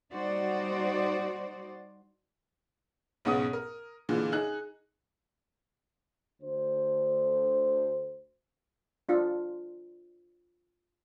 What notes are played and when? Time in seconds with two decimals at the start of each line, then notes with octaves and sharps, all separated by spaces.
0.13 G3 D#4 F#4 C5 D5
3.25 B1 G#2 C#3 B3 F#5 D#6
3.53 A#4
4.09 A#2 D3 E3 G#3
4.32 D#4 G#4 F#6
6.42 D2 C5
9.09 D4 F4